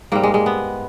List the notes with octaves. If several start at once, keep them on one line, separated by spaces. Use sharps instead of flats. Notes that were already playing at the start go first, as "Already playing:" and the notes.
G#2 G3 A#3
G#3
G#3
B3